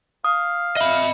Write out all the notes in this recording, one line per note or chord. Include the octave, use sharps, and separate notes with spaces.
F5 D#6
D#5 E5 B5